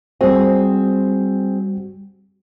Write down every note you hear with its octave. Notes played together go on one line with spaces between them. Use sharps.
G3 C4 F#4 G#4